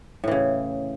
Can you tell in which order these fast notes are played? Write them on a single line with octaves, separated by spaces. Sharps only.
A2 E3 C#3